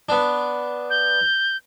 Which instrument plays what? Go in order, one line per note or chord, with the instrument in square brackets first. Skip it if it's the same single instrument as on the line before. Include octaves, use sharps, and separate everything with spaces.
[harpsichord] B3 D4
[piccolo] G6